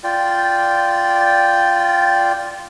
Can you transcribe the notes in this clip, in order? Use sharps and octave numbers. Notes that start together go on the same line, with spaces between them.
F4 D5 G5